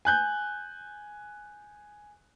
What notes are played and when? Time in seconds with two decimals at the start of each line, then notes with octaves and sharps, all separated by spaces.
0.05 G#5 F#6 G6